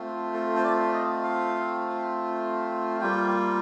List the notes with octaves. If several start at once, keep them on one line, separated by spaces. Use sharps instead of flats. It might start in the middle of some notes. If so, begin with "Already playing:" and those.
Already playing: A3 C4 F4
A4
C5
D5
D#5
F5
G3 A#3 F4 G5